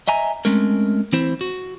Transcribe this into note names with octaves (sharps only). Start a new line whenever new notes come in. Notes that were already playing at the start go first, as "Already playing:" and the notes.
D#5 E5 G#5 A#5
G#3 A3 C4 C#4 A#4
E3 C4 E4 C5
F#4